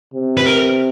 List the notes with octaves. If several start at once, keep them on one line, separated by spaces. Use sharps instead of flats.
C3
B4
A#4